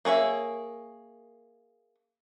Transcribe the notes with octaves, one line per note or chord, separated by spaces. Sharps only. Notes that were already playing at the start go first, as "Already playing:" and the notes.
A#3 G#4 C#5 E5